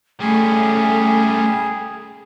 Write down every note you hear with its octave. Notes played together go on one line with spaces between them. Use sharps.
G3 A3 C#4 G#4